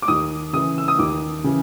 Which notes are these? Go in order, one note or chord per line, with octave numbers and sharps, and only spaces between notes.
D6
D#2 D#6
C#3 E3 D#6
E6
D#6
D#2 D6
C#3 E3